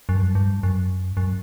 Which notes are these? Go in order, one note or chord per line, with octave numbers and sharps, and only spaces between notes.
F#2
G2
F#2
G2
F#2
F#2